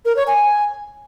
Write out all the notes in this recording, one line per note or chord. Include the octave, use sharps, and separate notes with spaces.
A#4
C#5
G#5